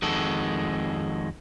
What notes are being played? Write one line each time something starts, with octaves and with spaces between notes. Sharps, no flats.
F2 D#3 G#3 F#4 A4